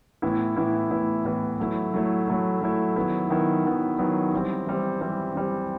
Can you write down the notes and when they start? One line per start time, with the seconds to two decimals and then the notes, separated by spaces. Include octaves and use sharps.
0.22 A2 E3 B3 E4
0.56 A2 E3 B3 E4
0.91 A2 E3 B3 E4
1.25 A2 E3 B3 E4
1.60 F#3 A3 E4
1.94 F#3 A3 E4
2.28 F#3 A3 E4
2.61 F#3 A3 E4
2.96 D#3 F#3 B3 E4
3.30 D#3 F#3 B3 E4
3.65 D#3 F#3 B3 E4
3.99 D#3 F#3 B3 E4
4.33 E3 G3 C4
4.67 E3 G3 C4
5.01 E3 G3 C4
5.36 E3 G3 C4